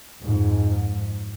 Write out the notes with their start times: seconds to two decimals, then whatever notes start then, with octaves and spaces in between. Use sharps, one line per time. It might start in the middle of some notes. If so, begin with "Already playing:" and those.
0.19 F2 G#2